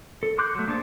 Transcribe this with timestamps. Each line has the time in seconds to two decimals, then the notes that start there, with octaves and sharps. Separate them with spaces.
0.23 A4
0.38 C6 D6 F#6 G6
0.55 F#3 A3
0.67 A#3 D4 G#4 C5 A5